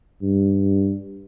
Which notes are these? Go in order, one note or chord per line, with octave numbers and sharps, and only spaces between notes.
G2